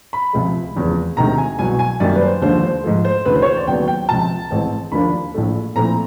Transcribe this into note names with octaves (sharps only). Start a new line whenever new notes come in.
B5
C#2 C3 F3 G#3
F1 E2 C#3 F3
D2 C3 D#3 G#3 A#5
G#5
C2 B2 F#3 G#5
G#5
F#2 D#3 G3 A#3 D5
B4
C5
D#2 D3 F3 G#3 C5
C5
G#2 F3 A3
C5
D2 C#3 E3 B4
C5
C#5
C5
D5
D#2 C#3 F#3 B3 G5
G5
C#2 C3 F3 A5
A1 G#2 E3 G#3 C4
D#2 D3 F3 A#3 D4 B5
A#1 A2 F3 A3
A#2 F3 A3 C4 E4 A#5